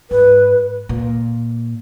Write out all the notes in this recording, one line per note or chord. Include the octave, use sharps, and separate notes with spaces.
G#2 B4
A#2